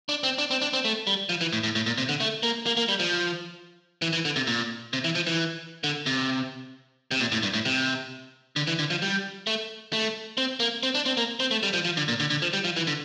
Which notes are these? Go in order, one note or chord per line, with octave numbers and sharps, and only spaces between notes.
D4
C4
D4
C4
D4
C4
A3
G3
F3
E3
A2
A2
A2
A#2
C3
D3
A3
A#3
A#3
A#3
G3
F3
E3
E3
D3
C3
A#2
C3
E3
F3
E3
D3
C3
C3
A#2
A2
G2
A2
C3
D3
E3
D3
F3
G3
A3
A3
C4
A#3
C4
D4
C4
A#3
C4
A3
G3
F3
F3
D3
A#2
D3
D3
F3
G3
F3
E3
D3